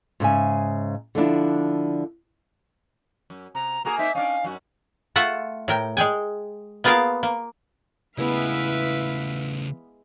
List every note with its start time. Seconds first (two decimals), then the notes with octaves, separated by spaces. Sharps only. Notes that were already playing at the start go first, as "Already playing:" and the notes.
0.20 G#2 C#3 E5 G#5
1.15 D3 F3 D4 E4
3.30 F#2
3.55 C3 A#5
3.85 A#3 F#4 G#4 A#5
3.99 A#3 C4 D#4 E5
4.15 C#4 D4 F5
4.44 F#2 F#4
5.16 A3 F4 E5 F#5
5.68 A2 A#4 G5
5.97 G#3 G#4 G5 G#5
6.84 A#3 B3 F4 G#4 A#4 F5
7.23 A#3
8.18 C#3 G#3 A3 B3 E4 B4 E5 F5